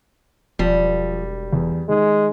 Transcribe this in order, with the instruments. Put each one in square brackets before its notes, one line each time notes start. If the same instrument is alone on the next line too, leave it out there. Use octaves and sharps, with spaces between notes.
[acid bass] E1 [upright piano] F3 [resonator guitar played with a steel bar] G3
[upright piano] E2
[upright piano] D#3 [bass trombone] G#3